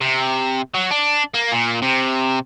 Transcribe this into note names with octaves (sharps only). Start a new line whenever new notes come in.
C3
F#3
D4
A#3
A#2
C3